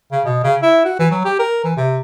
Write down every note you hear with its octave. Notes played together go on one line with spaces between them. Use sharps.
C#3
B2
C#3
E4
F#4
E3
F#3
G4
A#4
E3
C3